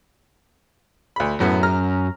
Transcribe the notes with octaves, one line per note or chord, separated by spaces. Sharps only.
D2 B5
F#2 A2 B3
A#5 F6